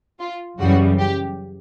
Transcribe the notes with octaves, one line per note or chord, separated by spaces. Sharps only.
F4
F#2 C#3 E3 G3 F#4
G4